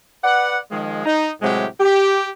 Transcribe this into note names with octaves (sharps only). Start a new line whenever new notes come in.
B4 D5 F#5
D#3 F3 G#3
D#4
A2 C3 F#3 G#3 G4
G4